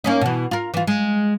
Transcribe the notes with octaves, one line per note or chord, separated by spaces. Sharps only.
A#3 C#4 D#4
B2 E3
F4 A#4
E3 F4
G#3